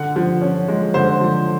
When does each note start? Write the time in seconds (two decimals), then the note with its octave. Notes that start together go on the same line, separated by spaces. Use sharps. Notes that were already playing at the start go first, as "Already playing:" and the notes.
Already playing: D3 F#5
0.16 F3
0.41 C#4
0.68 G#3
0.94 D3 C5
1.21 F3